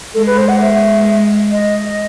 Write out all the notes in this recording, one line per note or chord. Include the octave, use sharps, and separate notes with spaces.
G#3 A4
B4
C5
F#5
E5
D#5